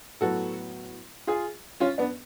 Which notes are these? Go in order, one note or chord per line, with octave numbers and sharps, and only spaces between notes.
A2 F#3 B3 F#4 A4
F4 G#4
C#4 F4
B3 D4